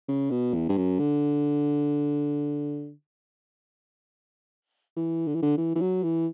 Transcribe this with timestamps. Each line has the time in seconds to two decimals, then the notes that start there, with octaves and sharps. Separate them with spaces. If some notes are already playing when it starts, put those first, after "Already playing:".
0.08 C#3
0.31 B2
0.54 E2
0.69 G2
0.77 F#2
0.99 D3
4.96 E3
5.27 D3
5.35 E3
5.42 D3
5.58 E3
5.75 E3
5.81 F#3
6.03 E3